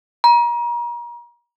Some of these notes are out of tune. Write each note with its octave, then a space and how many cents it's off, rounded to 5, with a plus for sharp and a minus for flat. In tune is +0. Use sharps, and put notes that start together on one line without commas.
A#5 +35